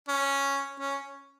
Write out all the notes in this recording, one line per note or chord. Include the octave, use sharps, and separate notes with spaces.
C#4
C#4